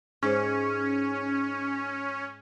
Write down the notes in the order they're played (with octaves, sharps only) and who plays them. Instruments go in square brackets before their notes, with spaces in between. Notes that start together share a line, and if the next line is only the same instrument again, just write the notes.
[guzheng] G#2 [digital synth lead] C#4